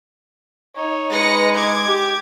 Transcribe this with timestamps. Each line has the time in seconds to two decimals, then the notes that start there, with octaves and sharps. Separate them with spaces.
0.76 D#4 C#5
1.11 G#3 B4 A#6 C#7
1.55 D6 G#6
1.87 G4